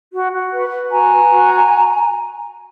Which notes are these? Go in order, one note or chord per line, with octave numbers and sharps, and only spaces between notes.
F#4
F#4
B4
B4
F#4 G#5 A#5
B4
F#4